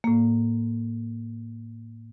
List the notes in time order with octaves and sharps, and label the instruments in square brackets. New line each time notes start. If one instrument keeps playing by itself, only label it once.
[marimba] A2 A#3